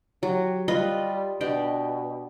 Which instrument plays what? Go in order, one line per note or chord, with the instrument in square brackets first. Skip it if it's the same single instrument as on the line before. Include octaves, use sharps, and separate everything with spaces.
[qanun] F#3 [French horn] G4
[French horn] G3 [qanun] F4 B4 D#5
[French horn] B2 [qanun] D4 G4 D#5